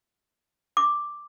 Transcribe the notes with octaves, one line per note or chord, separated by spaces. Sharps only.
D6